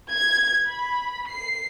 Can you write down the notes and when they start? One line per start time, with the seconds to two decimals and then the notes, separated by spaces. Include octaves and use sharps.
0.10 G#6
0.67 B5
1.28 C7